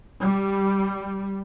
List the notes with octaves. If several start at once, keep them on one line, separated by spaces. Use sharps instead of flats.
G3